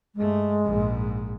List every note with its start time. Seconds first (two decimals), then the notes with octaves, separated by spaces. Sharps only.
0.16 G2 G#3 A3
0.63 A#1 G#2